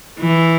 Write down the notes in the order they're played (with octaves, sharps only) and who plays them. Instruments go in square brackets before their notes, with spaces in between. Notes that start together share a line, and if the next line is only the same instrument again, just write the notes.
[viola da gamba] E3